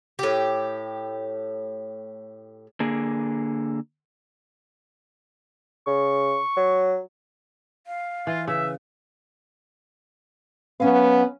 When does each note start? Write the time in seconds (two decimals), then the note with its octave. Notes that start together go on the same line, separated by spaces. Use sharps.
0.19 A2 G4
2.80 D3 A#3 G#4
5.87 C#3 C#6
6.57 F#3
7.87 F5
8.27 E3 F4
8.48 C#3 B4 E5
10.80 F#3 B3 C#4 F5